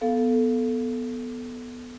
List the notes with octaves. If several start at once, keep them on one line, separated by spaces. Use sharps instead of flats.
B3 A4 F5